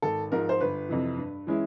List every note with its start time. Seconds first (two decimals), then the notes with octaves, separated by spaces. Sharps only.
0.02 G#1 A4
0.32 G#2 F3 A#4
0.49 C5
0.60 G1 B4
0.89 F2 C3 E3
1.17 G2
1.47 E3 G#3 C#4 E4